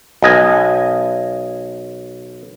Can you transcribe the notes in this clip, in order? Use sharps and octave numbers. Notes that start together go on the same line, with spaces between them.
B1 D#5 G#5